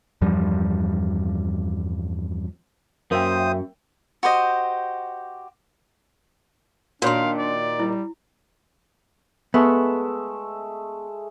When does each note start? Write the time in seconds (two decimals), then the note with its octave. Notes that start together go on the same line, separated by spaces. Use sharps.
0.22 E2 G2 F3 G3
3.11 F#2 A#3 C5 E5 G5 D#6
4.23 F#4 G4 C5 D#5
7.02 A#2 D#3 D4 F#4 C#5 F5 C6
7.37 D5
7.80 G3 E4
9.54 G#3 A3 B3 E5